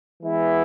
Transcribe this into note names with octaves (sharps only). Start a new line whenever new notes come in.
E3 G#3 B3 E4